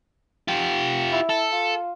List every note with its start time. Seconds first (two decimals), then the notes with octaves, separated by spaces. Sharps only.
0.48 F4 G4
1.12 E4
1.29 A4
1.52 F4